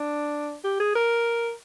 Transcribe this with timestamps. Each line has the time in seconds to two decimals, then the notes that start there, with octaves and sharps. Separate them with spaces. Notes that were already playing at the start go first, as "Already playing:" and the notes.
Already playing: D4
0.64 G4
0.80 G#4
0.95 A#4